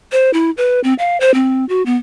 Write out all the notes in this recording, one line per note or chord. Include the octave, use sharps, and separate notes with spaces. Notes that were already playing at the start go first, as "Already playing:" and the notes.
C5
E4
B4
C4
F5
C5
C4
F#4
B3